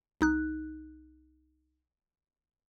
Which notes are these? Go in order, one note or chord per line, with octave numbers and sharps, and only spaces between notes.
C2 D#4 F#6